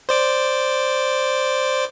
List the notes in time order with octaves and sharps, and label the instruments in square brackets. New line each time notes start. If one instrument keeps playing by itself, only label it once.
[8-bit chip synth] C5 D5 D6